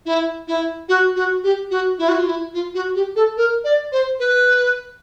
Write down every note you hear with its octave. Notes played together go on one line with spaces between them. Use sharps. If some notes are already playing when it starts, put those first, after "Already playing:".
E4
E4
F#4
F#4
G4
F#4
E4
F#4
F4
E4
F4
F#4
G4
A4
A#4
D5
C5
B4